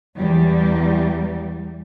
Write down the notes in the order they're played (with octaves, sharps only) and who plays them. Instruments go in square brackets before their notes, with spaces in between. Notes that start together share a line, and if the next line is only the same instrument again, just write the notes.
[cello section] E2 G3